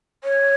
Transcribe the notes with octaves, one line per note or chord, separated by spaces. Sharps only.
C#5